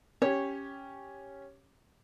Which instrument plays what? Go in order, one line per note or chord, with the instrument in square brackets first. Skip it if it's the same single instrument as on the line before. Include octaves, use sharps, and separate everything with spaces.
[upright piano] C#4 G4 [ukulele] C#5